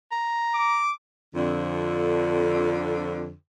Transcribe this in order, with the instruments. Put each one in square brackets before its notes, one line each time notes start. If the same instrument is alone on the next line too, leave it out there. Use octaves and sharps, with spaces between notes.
[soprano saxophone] A#5
[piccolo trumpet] D6
[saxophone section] F2 D3